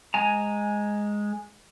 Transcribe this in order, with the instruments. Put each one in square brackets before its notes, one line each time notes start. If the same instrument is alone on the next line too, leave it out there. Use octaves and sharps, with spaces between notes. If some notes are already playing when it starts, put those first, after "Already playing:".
[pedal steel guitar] G#3 G#5 A#5